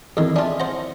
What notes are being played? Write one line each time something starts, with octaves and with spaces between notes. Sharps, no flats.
F2 D#3 C4 E4 G#4
D4 F4 E5 G#5 D#6
C5 F#5 A#5